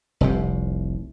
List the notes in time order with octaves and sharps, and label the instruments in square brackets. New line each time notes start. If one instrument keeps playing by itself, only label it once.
[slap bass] F1 C2 C3